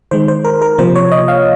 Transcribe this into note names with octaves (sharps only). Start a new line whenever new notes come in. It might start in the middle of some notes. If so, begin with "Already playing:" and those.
D#3 G#3 C5
C5
A#4
A#4
C3 F3 A#3 C5
C#5
D#5
F5